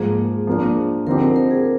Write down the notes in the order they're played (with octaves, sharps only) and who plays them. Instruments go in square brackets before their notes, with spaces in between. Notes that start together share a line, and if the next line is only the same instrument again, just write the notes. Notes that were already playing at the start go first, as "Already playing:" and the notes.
Already playing: [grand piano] G#2 F3 A#3 [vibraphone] G#4
[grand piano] F3 A#3 D4
[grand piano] D3 F3 C4 D#4 G4 [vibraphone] A#4
[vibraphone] C5
A#4
G#4